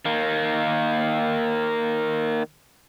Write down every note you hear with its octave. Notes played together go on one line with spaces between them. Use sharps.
D#3 A#3